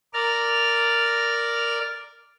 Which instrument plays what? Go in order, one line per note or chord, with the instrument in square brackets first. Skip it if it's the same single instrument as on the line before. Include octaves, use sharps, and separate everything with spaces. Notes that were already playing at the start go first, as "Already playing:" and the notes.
[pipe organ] A#4 D5 F6